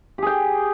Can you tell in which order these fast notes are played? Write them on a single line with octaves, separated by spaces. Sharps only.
G4 G#4 G5